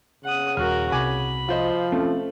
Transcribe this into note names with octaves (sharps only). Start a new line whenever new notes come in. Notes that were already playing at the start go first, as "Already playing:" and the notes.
C#3 F#5 D#6
D#1 F#4 A#4 F6
C2 G#5 B5 D6
F3 F4 C5 D#5
A3 C4 C#4